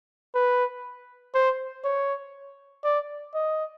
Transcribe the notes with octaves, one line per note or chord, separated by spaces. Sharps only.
B4
C5
C#5
D5
D#5